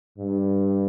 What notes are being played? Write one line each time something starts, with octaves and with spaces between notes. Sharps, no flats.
G2